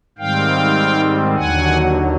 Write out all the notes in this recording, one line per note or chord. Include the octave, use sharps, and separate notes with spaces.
G#2 D#3 G3 C4 F5 G5
D#2 D3 F#3 F#5 G#5